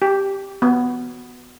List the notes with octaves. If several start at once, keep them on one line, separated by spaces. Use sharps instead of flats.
G4
B3